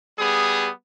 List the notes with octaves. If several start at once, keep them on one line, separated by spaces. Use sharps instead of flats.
G3 B3 G#4 D#6